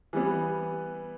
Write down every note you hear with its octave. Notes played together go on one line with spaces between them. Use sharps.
E3 G3 B3